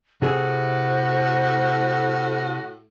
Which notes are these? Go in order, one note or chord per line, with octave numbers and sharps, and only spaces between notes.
A2 C3 F#4 G#4 C5 E5